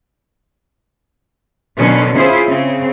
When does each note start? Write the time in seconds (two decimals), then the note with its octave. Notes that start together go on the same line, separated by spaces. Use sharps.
1.78 B2 D3 D#3 F#3 C#4
2.15 C#4 E4 F4 G#4 C5
2.48 C#3 C4